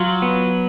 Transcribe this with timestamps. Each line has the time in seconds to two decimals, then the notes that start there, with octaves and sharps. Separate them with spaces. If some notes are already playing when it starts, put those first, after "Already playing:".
Already playing: F#3 F4
0.22 B3